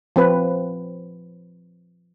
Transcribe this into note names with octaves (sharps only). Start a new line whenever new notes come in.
F3 C4 B4